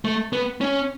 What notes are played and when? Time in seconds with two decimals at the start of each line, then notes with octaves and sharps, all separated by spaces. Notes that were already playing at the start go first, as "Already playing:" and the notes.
0.05 A3
0.33 B3
0.61 C#4